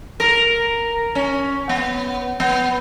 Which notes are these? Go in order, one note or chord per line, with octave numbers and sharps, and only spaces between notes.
A#4
C#4
B3
B3